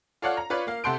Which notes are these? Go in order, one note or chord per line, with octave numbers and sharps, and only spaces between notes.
F4 A4 C#5 D5 F5 F#5
A#5
F4 B4 C#5 D5
A#3 F5
C3 A4 F#5 C6 G6 D7